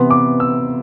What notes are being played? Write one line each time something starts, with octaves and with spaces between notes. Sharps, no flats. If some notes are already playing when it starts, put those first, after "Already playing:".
Already playing: C3 E3 B3 C6
D6
E6